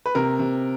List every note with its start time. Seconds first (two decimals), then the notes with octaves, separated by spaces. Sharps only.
0.06 B4
0.15 C3 A#4
0.39 C3